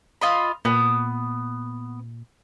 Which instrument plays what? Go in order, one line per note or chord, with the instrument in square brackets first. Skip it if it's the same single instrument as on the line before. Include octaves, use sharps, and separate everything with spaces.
[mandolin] F4 D#5 B5
[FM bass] A#2 [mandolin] B3